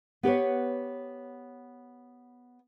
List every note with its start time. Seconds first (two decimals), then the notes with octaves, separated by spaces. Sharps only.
0.23 B3 G4 B4 C#5